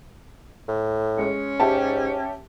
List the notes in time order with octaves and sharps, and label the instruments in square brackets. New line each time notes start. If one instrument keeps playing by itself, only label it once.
[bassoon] A2
[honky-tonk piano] G#3 [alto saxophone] C#4
[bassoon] G#2 [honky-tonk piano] G4 E5 A5